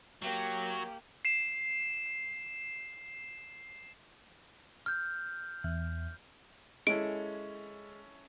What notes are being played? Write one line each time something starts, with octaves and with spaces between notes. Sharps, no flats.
F#3 A#3 G4
C7 E7
F6 G6
E2
G#3 C#4 E4 A4 D7